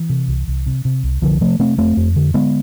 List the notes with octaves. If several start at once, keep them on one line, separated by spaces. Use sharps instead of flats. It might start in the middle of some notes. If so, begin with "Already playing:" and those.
Already playing: E3
C3
C2
C2
C3
C3
C2
C2 D3 F3
C3 F3 A3
C3 A3 C4
F2 A3 C4
F2
D3
D3 G#3 B3